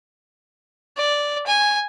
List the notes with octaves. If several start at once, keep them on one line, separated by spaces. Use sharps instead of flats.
D5
G#5